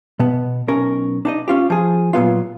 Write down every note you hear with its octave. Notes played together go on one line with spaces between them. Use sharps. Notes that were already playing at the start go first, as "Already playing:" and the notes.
B2 B3
B1 C#4 A#4
D4 D#4 D#5
C#4 F4 G4
F3 G#4
A#2 F#3 B3 F4